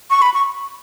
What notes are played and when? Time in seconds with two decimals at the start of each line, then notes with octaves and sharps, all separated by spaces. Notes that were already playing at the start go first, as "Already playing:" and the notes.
0.10 C#6
0.22 B5
0.34 C#6